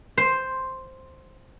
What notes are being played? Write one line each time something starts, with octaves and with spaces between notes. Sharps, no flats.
C5